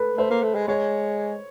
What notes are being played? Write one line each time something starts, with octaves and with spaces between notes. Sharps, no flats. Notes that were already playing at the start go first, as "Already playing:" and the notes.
Already playing: A4 B4
A3 C5
A#3
A3
G#3
G#3 C#5